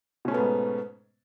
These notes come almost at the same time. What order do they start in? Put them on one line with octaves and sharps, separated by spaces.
B2 C#4 A3 B3 G#2